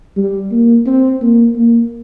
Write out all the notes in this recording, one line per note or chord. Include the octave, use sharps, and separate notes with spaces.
G3
A#3
C4
A#3
A#3